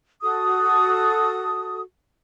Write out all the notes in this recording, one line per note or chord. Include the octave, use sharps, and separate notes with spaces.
F#4 A4 D#6